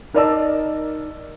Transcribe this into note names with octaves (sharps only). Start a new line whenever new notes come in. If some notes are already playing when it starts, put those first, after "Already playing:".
D#4 A#4 D5 D#5 A5 E6